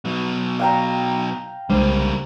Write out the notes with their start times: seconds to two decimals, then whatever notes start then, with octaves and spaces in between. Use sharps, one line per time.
0.05 B2 F#3
0.59 F5 G5 A#5
1.70 C2 C#3 G3 G#3 A#3 D4 C5